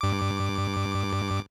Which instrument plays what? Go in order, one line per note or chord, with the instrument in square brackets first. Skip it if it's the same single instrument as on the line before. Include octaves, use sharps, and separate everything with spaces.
[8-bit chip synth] G2 D6